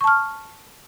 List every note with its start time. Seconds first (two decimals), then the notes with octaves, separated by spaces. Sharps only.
0.01 C#6
0.04 A5
0.07 F6